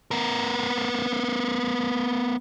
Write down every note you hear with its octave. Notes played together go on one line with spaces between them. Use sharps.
B3 A#4